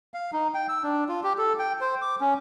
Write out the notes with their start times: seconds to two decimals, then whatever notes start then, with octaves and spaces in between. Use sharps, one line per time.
0.14 F5
0.33 D#4
0.54 G5
0.69 E6
0.83 D4
1.09 F4
1.23 G4
1.38 A4
1.59 G5
1.81 C5
2.02 D6
2.21 C#4